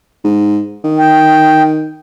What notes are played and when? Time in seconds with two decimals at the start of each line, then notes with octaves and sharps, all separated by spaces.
0.25 G#2
0.84 D#3
0.99 G5